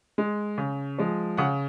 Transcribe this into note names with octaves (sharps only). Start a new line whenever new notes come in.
G#3
C#3
F3 G#3
C#3 F#5